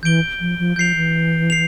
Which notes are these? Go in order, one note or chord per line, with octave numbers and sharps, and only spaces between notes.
E3 G6 D7 G7
F3
F3
F3 G6 C7 F7
E3
C7 F7